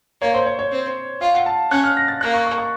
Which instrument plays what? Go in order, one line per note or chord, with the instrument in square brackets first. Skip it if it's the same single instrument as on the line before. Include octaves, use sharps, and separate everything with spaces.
[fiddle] A#3 [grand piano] C#5
[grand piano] C5
C#5
C#5
[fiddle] C4
[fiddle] F4 [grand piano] F5
[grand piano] F#5
A5
[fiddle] C#4 [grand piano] F#6
[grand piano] F6
A#6
A6
[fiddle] A#3 [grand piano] F#6
[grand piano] C#6
C#6
C#6